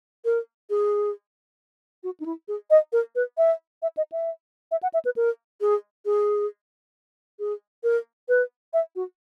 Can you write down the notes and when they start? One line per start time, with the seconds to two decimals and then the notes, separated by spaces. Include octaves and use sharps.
0.25 A#4
0.70 G#4
2.03 F#4
2.20 D#4
2.26 E4
2.48 G#4
2.70 D#5
2.93 A#4
3.15 B4
3.38 E5
3.82 E5
3.97 D#5
4.12 E5
4.71 E5
4.83 F#5
4.94 E5
5.05 B4
5.16 A#4
5.61 G#4
6.06 G#4
7.39 G#4
7.84 A#4
8.29 B4
8.74 E5
8.96 F#4